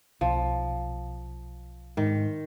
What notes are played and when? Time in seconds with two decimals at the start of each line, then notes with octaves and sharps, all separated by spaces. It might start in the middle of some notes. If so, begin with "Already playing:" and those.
0.21 B1 F3
1.97 G#2 D#3